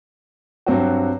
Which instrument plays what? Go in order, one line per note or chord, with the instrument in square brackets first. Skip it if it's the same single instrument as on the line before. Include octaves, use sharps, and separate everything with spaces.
[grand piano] G2 F#3 C4 F#4